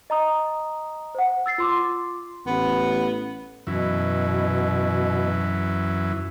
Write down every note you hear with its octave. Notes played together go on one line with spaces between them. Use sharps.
D#5 A#5 D#6
C5 F#5
E6 A6 C7
F4 C6 D6
A1 B3
F#2 B2 E3